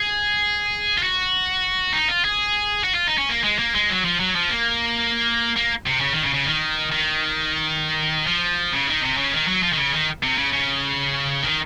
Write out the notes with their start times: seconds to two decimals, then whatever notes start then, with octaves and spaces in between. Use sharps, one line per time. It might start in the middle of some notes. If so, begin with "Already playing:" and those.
Already playing: G#4
0.98 F4
1.03 F#4
1.93 D#4
2.09 F4
2.25 G#4
2.84 F#4
2.95 F4
3.07 D#4
3.18 C#4
3.29 A#3
3.44 G#3
3.59 A#3
3.75 G#3
3.90 F#3
4.05 F3
4.20 F#3
4.36 F3
4.50 A#3
5.56 A#3
5.86 C3
6.00 C#3
6.13 D#3
6.23 C#3
6.34 C#3
6.45 D#3
6.92 D#3
8.27 F3
8.73 C#3
8.87 D#3
9.02 C3
9.17 C#3
9.33 D#3
9.48 F#3
9.63 F3
9.73 D#3
9.77 C#3
9.92 D#3
10.23 C3
10.37 C#3
10.53 C#3
11.43 D#3